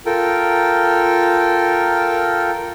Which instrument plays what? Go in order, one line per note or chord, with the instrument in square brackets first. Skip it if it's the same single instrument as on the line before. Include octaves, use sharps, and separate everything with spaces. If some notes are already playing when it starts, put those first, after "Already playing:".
[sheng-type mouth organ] F4 A4 A#4 G5